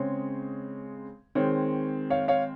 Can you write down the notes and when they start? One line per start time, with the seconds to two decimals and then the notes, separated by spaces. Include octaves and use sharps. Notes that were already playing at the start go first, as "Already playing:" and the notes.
Already playing: C#3 G#3 C4 C#5
1.35 D#3 G#3 C4 C#5
2.10 C#5 F5
2.28 C#5 F5